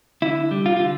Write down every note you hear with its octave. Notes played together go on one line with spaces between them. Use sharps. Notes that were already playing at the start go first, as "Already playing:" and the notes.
D3 E4
G3
F4
D3 F4